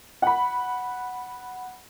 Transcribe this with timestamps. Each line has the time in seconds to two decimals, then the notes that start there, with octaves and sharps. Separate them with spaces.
0.22 F#5 B5